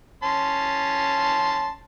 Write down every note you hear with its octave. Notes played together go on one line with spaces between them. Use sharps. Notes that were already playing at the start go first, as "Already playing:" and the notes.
C#4 A5 C6